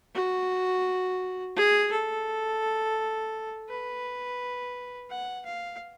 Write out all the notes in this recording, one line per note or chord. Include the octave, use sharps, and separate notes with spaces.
F#4
G#4
A4
B4
F#5
F5